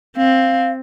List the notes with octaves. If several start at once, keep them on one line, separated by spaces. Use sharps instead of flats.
C4 F5